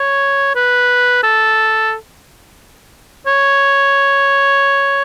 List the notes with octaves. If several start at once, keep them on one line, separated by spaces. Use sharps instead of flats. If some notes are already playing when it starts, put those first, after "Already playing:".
Already playing: C#5
B4
A4
C#5